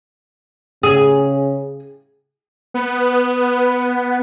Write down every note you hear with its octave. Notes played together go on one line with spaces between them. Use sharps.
C#3 G#4
B3